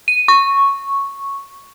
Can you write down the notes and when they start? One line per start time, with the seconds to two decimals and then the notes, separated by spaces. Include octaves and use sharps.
0.08 D#7
0.28 C#6